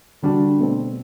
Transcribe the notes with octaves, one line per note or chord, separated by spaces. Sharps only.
D3 G3 D4 F#4
B2 A3 C4